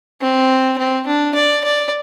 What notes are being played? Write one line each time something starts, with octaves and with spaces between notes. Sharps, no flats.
C4
C4
D4
D5
D5